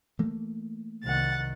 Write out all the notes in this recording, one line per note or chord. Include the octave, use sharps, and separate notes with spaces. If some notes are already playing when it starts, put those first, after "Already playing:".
E3 A3 A#3
C2 D#3 F#5 A6